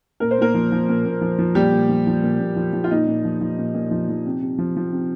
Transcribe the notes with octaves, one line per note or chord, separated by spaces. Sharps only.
A#2 A#4
C5
A#2 A#3 A#4
F3
F3
A#2
A#2
F3
F3
A#2 G3 G4
A#2
F3
F3
A#2
A#2
F3
F3
F4
A#2 D#4
A#2
F3
F3
A#2
A#2
F3
F3
C3
C3
F3
F3
C3